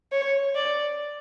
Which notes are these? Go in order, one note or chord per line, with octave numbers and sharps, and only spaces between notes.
C#5
D5